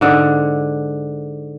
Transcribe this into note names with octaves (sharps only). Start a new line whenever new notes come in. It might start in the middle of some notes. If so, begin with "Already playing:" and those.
G#2 D3